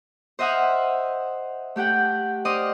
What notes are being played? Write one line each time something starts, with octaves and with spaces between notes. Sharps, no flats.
C5 D#5 E5 F#5 D#6 F6
A3 G4 F#5 G5
C5 D5 D#5 D#6 F6